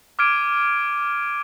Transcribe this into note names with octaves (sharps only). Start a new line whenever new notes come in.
D6 F6 G#6 D7 D#7